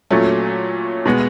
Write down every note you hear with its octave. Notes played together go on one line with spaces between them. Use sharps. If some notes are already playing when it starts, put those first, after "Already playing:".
A#2 F#3 A3 C#4
B2 G#3 B3